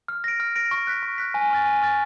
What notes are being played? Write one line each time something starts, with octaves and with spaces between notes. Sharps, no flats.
F6
A#6 D7
F6
A#6 D7
C#6
F#6 B6
C#6
F#6 B6
G#5
C#6 F6 A6
G#5
C#6 F6 A6